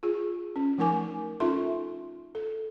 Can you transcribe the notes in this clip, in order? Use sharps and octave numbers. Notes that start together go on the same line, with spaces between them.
F4 G#4
C#4
F3 A3 D#4 A#4 G#5 D6
C#4 D#4 F4 A4 E5 C6
A4